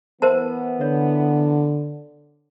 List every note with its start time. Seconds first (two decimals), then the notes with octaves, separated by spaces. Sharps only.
0.22 E3 B3 A#4 C5 A5
0.81 D3 C#5